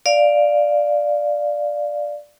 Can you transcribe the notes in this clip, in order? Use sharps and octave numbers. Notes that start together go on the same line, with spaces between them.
D5 F5